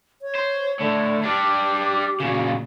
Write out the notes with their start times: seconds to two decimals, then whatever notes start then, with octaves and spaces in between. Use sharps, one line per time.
0.22 C#5
0.35 C5
0.79 A2 D3
1.24 G3 D4 G4
2.20 A#2 C#3 F#4